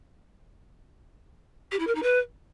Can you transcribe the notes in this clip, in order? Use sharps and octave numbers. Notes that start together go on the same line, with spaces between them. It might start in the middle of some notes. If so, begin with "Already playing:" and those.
G4
E4
A#4
D#4
B4